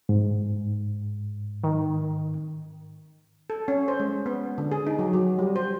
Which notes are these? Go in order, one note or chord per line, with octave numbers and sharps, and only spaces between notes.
G#2
D#3
A4
C#4
C5
G#3
B3
D3
G#4
D#4
F#3
F#3
G3
C5